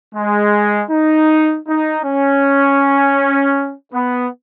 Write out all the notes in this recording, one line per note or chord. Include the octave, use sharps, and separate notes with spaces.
G#3
D#4
D#4
C#4
B3